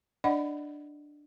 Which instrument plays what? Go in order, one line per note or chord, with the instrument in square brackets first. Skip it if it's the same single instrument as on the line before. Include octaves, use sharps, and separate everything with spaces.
[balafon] D4 D5 D#5 F#5 B5